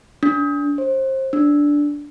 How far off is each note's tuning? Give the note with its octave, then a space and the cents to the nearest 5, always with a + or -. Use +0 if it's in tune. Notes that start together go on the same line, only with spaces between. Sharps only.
D4 -30
C5 +25
D4 -5